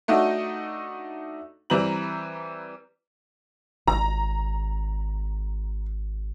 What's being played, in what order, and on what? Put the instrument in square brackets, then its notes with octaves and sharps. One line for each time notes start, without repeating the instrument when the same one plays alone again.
[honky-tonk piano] A3 D4 D#4 F#4
E3 G3 C4 B4 A#5 F#7
[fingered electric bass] G#1 [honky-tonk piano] A#5